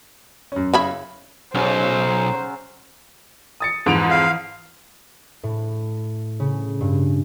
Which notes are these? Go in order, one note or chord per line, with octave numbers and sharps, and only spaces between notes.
F#2 C#4
C#3 E4 B5
B1 C#3 F#3 C#4 C5
D#6 A6 C#7
F2 G#2 E3 D7 F7
F5
A2
C#3
G2